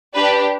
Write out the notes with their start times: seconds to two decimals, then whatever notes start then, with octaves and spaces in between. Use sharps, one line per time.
0.15 D4 G4 B4